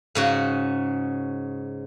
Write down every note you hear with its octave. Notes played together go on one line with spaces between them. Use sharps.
G#2 C#3 F#4